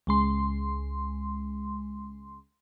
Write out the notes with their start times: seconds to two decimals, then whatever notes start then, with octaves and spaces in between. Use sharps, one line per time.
0.07 C#2 G#3 C6